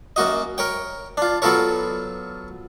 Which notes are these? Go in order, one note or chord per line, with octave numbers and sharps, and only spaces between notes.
F#2 A#3 F#4 D#5
A#4 C#5 G5
D4 F4
F#3 B3 F4 A4 A#4 C#5